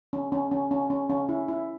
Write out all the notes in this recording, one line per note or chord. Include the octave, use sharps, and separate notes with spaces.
C#4
C#4
C#4
C#4
C#4
C#4
E4
E4